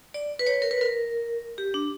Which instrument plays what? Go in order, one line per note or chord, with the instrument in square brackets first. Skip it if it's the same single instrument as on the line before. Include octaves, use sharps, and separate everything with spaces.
[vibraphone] D5
B4
C#5
A#4
B4
A#4
G4
D4